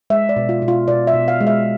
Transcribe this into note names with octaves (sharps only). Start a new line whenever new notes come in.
G#3 E5
D5
B2
F4
B2
F4
B2 D5
E5
B2
F5
G#3
E5